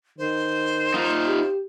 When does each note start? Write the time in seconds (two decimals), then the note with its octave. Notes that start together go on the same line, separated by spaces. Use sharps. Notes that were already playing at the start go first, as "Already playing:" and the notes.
0.18 D#3 C5
0.94 D#4 F4
1.27 G4